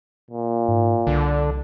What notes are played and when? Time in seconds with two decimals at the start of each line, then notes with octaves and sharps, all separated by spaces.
0.31 A#2
0.68 G#2
1.07 C2 D3